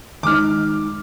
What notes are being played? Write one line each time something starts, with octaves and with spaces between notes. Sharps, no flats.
D#3 G#3 D#4 D6 F6